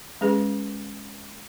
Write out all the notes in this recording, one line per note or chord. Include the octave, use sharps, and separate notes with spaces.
G#3 C#4 G#4 B4